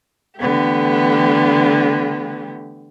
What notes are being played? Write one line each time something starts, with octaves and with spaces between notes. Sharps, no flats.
D3 E3 A3 B3 G4